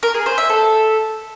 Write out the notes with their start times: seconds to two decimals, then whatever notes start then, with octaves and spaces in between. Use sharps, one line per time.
0.03 A#4
0.14 G#4
0.26 C5
0.38 E5
0.49 A4